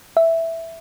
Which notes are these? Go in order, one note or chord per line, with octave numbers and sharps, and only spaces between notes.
E5